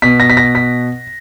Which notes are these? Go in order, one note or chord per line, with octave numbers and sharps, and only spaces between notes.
B2 B6
A#6
B6
A#6
B6